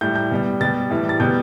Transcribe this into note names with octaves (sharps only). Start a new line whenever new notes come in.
A2 G3 G6
G6
B2 G3
B2 G3 A6
A2 E3 G3
A6
B2 G3 G6